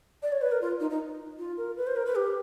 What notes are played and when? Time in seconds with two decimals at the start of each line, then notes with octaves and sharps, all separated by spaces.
0.22 D5
0.32 C#5
0.41 B4
0.52 A#4
0.61 F4
0.80 D#4
0.90 D#4
1.39 F4
1.57 A#4
1.77 B4
1.87 C5
1.96 A#4
2.06 B4
2.15 G4